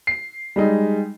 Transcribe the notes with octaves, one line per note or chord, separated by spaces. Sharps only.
C7
G3 G#3 D#4